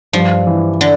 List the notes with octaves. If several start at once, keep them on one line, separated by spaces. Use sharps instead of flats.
G2 F3
E3
D3